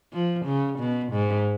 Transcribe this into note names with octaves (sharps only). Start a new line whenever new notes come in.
F3
C#3
B2
G#2